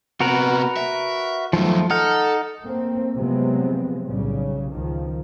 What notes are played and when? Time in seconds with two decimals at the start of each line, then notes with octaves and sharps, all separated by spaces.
0.20 C3 B3 F#4 A#4 B4
0.76 E5
1.53 F#2 D#3 F3 A3
1.90 D#4 A4 F#5 F6
2.63 A3 A#3 C4
3.16 C3 F3 F#3 G#3 B3 C4
4.07 B1 A2 C#3 G3
4.72 C#2 D#3 F3